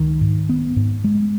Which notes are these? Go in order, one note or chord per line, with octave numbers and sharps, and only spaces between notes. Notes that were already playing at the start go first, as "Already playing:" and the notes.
Already playing: C#2 D#3
G#2
B3
G#2
G#3